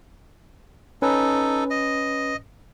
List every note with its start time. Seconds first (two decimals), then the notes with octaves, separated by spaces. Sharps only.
1.02 C#4 D#4 A4 B4
1.70 D#5